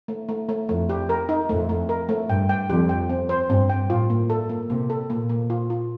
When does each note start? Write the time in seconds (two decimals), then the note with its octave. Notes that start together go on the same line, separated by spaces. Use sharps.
0.08 A3
0.29 A3
0.49 A3
0.69 F2 A3
0.89 G4
1.09 A#4
1.29 D#4
1.49 F2 A3
1.69 A3
1.89 A#4
2.09 A3
2.29 G2 G5
2.49 G5
2.69 F2 G4
2.89 G5
3.09 C4
3.29 C5
3.49 G2 C4
3.70 G5
3.89 A2 F4
4.10 A#3
4.30 A4
4.49 A#3
4.70 C3 A#3
4.90 A4
5.10 A#2 A#3
5.29 A#3
5.50 F4
5.70 F4